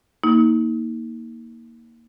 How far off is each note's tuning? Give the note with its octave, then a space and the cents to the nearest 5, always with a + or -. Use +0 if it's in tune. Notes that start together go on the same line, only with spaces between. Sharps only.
A#3 +0 D#4 +30